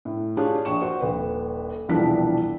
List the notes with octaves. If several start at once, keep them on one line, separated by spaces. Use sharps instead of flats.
A2
D4 F4 G4 G#4 C#5
A#1 C#6 E7
F#4 C5 C#6
D#1 A#1 B4
E1 C2 E3 F3 D4 B6